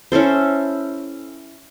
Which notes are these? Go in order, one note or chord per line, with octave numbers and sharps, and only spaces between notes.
C#4 E4 A4 C5